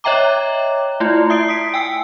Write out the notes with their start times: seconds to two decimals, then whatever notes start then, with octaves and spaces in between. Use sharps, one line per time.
0.04 C#5 D#5 E5 G5 A#5 D6
1.00 A3 E4 F4
1.30 E5 D#6 C7 D7
1.48 D#6 B6 D7
1.74 G5 G#5 E6